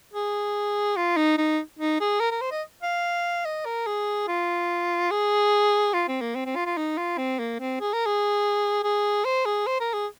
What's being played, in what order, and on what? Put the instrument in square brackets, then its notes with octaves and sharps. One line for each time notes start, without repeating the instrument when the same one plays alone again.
[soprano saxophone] G#4
F4
D#4
D#4
D#4
G#4
A#4
A#4
C5
D#5
F5
D#5
A#4
G#4
F4
G#4
F4
C4
A#3
C4
C4
F4
F4
D#4
F4
C4
A#3
C4
G#4
A#4
G#4
G#4
C5
G#4
C5
A#4
G#4